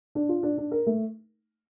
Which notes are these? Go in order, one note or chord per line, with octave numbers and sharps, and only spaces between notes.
D4
F4
D4
D4
A#4
A3